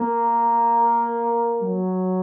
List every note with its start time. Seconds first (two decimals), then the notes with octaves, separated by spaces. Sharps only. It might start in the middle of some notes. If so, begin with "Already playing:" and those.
Already playing: A#3
1.60 F#3